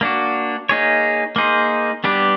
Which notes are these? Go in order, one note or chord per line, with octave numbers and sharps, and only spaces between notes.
A#3 D4 F#4
A#3 D#4 G#4 C#5
A#3 D#4 G#4 C5
G3 B3 D4 G4 B4